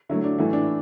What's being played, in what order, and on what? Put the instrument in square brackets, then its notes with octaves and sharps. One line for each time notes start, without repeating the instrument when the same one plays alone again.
[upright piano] D3 F#3 A3 E4
D4
A2 E3 A3 E4
D4